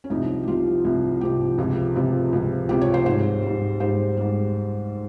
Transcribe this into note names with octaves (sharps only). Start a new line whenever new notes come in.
C#4
C2 C3 F3 D#4
G4
C2 C3 F3 F4
C2 C3 F3
C2 C3 F3 G4
C#2 C3 F3
C#2 C3 F3
C#2 C3 F3
C#2 C3 F3 G4
C#5
C5
G#2 G3 C5
G#2 G3
G#2 G3 C5
G#2 G3